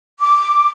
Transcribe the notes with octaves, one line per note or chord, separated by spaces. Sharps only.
D6